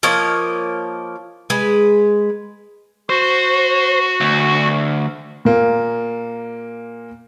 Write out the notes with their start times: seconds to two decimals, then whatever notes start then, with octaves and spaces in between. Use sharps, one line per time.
0.03 F3 A#3 C#5 D#5
1.50 G#3 B4
3.09 F#4 C5
4.21 D2
5.45 A#2 A#3